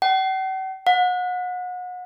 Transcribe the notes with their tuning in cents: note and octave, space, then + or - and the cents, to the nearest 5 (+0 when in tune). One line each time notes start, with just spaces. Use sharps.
F#5 +45
F#5 -35